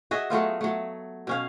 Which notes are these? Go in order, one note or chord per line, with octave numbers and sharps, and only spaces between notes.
F#4 G#4 D#5 E5
F#3 A3 B3 F4
F#3 A3
B2 C#4 F5